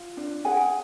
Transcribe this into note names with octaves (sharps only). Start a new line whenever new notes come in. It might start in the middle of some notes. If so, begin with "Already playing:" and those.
Already playing: F4
D4
G#4 F#5 G#5